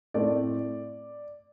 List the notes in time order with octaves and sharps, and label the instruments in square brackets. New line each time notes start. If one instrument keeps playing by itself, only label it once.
[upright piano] A2 A3 C4 D5